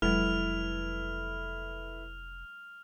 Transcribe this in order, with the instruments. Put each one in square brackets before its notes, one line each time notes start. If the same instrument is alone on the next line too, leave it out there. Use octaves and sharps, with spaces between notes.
[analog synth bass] F1 [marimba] F#3 G#3 [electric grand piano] E4 A4 B4 [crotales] F6 F7